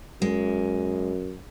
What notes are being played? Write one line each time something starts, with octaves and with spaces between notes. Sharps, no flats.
F#2 G#3